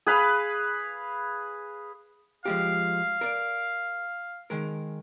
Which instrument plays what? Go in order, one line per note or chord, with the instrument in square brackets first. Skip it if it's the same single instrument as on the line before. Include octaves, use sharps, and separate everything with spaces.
[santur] G#4 B4 F5 B5
[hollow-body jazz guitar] F3 G#3 G4 [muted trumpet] F5
[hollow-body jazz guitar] A#4 D5
D#3 G#3 A#4